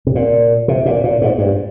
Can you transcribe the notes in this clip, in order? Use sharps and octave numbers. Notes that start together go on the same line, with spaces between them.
C3
A#2
C3
A#2
A#2
G#2
G2